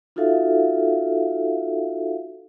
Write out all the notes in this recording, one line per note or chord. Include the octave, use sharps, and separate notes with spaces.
D#4 F4 F#4 A4 E5 F5